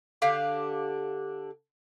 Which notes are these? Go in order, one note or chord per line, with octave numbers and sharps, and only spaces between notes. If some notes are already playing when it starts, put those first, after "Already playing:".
D3 D4 G4 F5